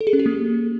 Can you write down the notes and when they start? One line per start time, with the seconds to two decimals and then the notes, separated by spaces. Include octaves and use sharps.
0.01 A4
0.07 G#4
0.13 C#4
0.19 G4
0.26 A#3